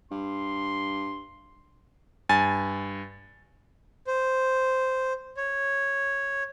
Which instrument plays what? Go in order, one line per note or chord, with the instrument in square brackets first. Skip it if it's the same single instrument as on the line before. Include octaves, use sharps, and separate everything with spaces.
[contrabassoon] G2 [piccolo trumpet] C6
[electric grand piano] G2 G#5 A6
[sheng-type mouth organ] C5
C#5